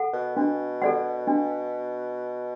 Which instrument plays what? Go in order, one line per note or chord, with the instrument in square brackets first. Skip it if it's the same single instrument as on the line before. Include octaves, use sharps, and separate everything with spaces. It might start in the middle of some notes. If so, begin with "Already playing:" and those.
Already playing: [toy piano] A4 F#5
[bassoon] B2
[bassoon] B2 [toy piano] D4
[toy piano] A4 D5 F#5
D4